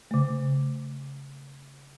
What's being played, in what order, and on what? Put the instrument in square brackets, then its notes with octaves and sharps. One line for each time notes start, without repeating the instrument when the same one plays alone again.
[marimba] C#3 A3